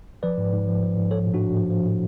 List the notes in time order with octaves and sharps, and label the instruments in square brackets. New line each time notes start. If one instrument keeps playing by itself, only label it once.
[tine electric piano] F3 B4 D5
G#2
G#2
F3
F3
G#2
F3 A4 C#5
A2
D4 F#4
A2
F3
F3
A2